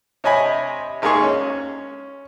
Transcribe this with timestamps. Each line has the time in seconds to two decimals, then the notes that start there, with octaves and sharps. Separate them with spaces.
0.24 C3 C#5 D#5 G#5 B5
1.02 G#1 G#3 A#3 D#4 G#4 C#6
1.23 C#4